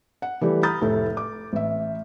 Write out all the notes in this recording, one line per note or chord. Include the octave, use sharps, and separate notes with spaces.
F#5
E3 G3 A3 G4 D5
A#5 B5 D#6 F6 G6 A6
F1 A2 A3 A4
D6
A1 E5